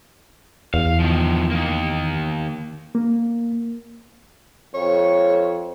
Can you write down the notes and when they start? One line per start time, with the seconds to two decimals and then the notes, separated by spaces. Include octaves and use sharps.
0.74 E2 F5
1.00 D#3 F3
1.51 D#3 A#3
2.95 A#3
4.74 F2 C#5